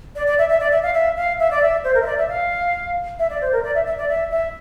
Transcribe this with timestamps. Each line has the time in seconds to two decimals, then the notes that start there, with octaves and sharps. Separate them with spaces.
0.15 D5
0.27 D5
0.38 E5
0.49 E5
0.60 D5
0.72 E5
0.83 F5
0.94 E5
1.17 F5
1.39 E5
1.51 D5
1.62 E5
1.84 C5
1.95 A#4
2.02 E5
2.06 D5
2.18 E5
2.29 F5
3.19 E5
3.30 D5
3.41 C5
3.52 A#4
3.64 D5
3.75 E5
3.86 E5
3.98 D5
4.09 E5
4.31 E5